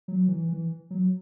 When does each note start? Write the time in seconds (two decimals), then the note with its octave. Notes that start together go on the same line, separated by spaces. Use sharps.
0.08 F#3
0.28 E3
0.49 E3
0.91 F#3